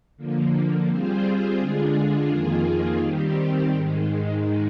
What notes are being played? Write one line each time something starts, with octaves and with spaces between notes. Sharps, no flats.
D3 F3 A#3
G3 C4 F4 G#4 C5
D3 G#3 D4 F4 G#4
F2 D#3 A#3 F4 G#4
D#3 G3 C4 G4
G#2 D#3 G#3